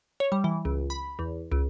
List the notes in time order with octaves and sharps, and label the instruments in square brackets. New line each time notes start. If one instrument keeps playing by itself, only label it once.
[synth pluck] C#5
G3
E3
C#2
B5
E2
C#2